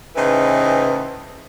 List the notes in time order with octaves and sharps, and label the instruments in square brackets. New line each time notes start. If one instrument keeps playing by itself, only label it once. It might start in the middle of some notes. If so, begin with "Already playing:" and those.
[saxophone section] A2 C#3 E3 D#4 B4 C5